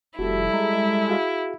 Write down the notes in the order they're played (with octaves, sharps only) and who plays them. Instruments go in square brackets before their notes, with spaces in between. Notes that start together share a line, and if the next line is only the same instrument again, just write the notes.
[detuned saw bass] F1 [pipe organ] G3 A4 E5 [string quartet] E4 [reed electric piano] F#4 G4
[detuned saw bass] G#3 [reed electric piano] A#5
[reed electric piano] F#4 G#4 F5